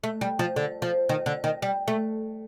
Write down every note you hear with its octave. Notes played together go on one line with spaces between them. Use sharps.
A3
G3
F3
D3
F3
D#3
D3
D#3
G3
A3